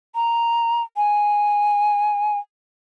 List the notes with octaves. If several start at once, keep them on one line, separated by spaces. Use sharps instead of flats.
A#5
G#5